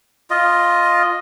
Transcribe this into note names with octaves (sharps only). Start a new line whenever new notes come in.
F4 D#5